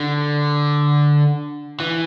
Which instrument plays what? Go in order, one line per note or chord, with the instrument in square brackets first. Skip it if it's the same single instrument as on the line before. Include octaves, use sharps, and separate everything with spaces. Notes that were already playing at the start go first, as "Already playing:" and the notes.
Already playing: [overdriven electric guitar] D3
E3